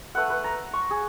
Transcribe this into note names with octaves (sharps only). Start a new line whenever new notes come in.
A3 B4 F#5
B4
A#5
C#6
G#4